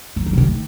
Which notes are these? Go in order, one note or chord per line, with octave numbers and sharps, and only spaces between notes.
F#3
F3
B2
D3
D#3